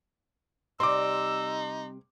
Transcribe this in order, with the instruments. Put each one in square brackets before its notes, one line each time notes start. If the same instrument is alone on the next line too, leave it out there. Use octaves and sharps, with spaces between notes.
[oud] C3 G3 C4 [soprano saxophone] D#4 [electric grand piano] C6 D6 [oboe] E6